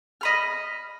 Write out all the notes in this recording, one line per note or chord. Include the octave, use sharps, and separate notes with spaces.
D#5 B5 F6